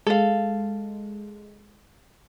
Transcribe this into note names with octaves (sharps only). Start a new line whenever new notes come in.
G#3 A4 F5